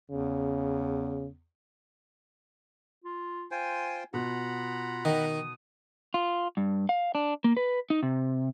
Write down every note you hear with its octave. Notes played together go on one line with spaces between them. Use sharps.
E2 C#3
F4
F4 C5 G5 G#5
B2 F4 F#5 A#5 B5
D#3 D#6
F4
G2
F5
D4
A#3
B4
D#4
C3